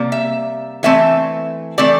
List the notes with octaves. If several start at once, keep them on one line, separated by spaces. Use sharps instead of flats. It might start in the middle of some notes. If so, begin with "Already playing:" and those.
Already playing: C3 G3 A#3
E5
E3 A3 C4 E5
E3 A3 C4 D5